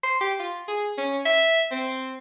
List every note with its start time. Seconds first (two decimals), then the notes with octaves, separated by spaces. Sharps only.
0.03 C6
0.21 G4
0.40 F4
0.68 G#4
0.98 C#4
1.25 E5
1.71 C4